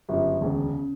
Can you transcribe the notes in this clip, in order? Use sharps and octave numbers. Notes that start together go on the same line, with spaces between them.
G1 F#2 C#3 G3
E1 D2 C#3
C#3